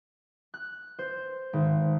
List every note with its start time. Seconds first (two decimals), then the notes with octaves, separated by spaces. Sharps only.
0.54 F#6
0.99 C5
1.53 G#1